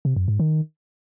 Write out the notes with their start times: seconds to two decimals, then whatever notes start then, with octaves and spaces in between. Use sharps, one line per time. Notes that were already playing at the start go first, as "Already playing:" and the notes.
0.05 C3
0.16 F#2
0.28 G#2
0.40 D#3